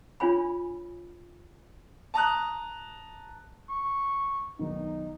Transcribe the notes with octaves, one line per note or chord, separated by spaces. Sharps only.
D4 F4 C#5 G#5 B5
A5 A#5 D#6 F#6
C#6
B1 D#3 D#4